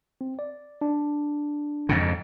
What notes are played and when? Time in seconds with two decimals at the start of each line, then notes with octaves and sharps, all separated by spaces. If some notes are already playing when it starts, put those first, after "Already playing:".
0.21 C4
0.39 D5
0.81 D4
1.89 F2 G#2 C#3